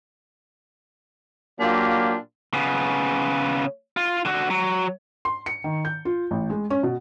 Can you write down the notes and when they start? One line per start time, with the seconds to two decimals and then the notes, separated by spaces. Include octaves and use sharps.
1.59 A#2 F#3 A#3 D4 F4 G4
2.54 C#3 B3
3.97 F4
4.25 D3 F#4
4.50 F#3
5.25 C6
5.46 C#7
5.64 D#3
5.85 G6
6.05 F4
6.31 A1
6.50 G#3
6.70 C#4
6.83 B2